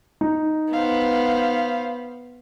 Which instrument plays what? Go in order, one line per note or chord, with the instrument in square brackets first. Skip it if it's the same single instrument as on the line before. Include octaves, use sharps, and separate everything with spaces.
[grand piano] D#4
[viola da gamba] B3 [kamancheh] C5 F5